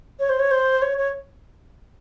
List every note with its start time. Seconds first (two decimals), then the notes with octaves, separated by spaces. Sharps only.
0.20 C#5
0.29 C5
0.39 C#5
0.51 C5
0.82 C#5
0.98 C#5